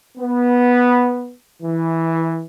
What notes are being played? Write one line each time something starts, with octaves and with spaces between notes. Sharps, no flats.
B3
E3